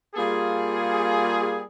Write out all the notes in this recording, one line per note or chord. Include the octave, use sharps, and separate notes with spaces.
G3 A#3 F4 G#4